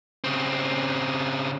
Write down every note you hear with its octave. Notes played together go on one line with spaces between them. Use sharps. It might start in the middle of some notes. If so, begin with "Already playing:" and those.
C#3 C4